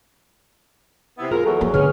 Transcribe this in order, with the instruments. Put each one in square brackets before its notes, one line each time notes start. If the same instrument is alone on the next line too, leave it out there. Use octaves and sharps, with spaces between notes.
[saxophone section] C3 B3 E4
[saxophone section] D#2 A#4 [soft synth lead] F4 [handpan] G#4
[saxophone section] E2 F#3 [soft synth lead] A4
[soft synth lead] F3 [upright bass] A#3 D4
[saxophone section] G2 G#3 C#4 [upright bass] D3 [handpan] G#4 B4 C#5 [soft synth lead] F6